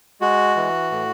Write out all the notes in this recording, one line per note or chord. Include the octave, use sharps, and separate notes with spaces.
G#3 F#4
E3
A2